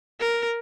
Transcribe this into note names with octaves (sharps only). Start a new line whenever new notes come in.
A#4